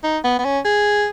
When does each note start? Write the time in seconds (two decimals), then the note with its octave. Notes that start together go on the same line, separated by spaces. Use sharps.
0.04 D#4
0.24 B3
0.39 B3
0.45 C#4
0.65 G#4